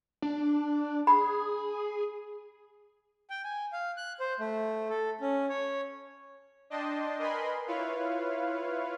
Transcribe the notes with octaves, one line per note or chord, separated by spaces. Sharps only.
D4
G#4 B5
G5
G#5
F5
F#6
C5
A3
A4
C#4
C#5
D4 D#5 G5 A5 C6
A#4 B4 D#5 G#5 B5 C6
E4 F4 B4 C#5 F5